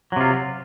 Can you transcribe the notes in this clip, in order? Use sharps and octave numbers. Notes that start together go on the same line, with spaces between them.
C3 F#3 F4